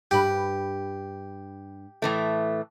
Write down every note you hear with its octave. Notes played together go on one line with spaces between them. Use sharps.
G2 G4 B4
A2 E3 A3